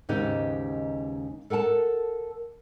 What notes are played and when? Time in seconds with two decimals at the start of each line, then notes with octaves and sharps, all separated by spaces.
0.09 D#2 G#2 C#3 B3 D#4 G4
1.50 A4 A#4 F#5 G#5 A5